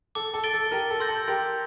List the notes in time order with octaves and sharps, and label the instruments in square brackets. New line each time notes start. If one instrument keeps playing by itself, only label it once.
[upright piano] A4 [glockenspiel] D6
[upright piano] A4
[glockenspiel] A6 D7 G7
[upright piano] A4
[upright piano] G4 A#4 [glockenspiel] A5
[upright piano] A4
[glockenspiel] C6 E6 G6 A#6
[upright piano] A4
[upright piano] G4 A#4 [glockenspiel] C6